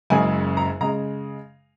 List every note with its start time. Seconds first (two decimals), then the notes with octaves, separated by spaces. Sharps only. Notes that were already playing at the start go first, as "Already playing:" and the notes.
0.10 F#1 F#2 C#3 G#3 G#5
0.57 A#5
0.81 C#3 G#3 A#5